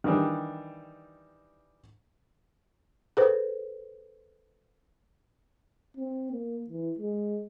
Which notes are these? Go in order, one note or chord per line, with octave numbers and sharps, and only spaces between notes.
D#3 E3 G3 D4
G#4 A4 B4 C5
C4
A#3
E3
G#3